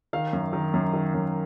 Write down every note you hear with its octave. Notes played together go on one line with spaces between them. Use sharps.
D#3 F5
F#2
D#3
F#2
D#3
F#2